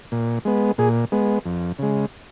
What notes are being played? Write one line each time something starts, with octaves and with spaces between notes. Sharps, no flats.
A#2
G#3 B3
A#2 G#4
G#3 B3
F2
C#3 G#3